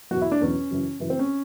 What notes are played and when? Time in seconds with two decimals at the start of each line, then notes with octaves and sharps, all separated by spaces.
0.11 E2 B2 F#3 F#4
0.22 E4
0.32 D4
0.41 E2 B2 F#3 C#4
0.71 F#2 C#3 E3
1.00 F#2 C#3 E3
1.10 C4
1.19 C#4